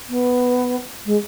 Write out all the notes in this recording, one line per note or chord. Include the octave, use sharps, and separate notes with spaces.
B3
G#3